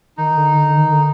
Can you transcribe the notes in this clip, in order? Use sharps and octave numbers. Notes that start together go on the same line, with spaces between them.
D#3 D#4
D#3
D3
D#3
D3
D3
D#3
D3